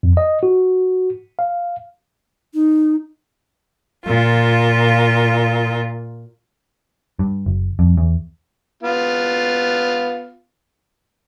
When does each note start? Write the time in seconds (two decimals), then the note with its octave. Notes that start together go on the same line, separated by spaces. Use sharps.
0.03 F2
0.17 D#5
0.43 F#4
1.39 F5
2.54 D#4
4.04 A#2 F4
7.19 G2
7.46 F#1
7.79 F2
7.97 E2
8.83 B3 F4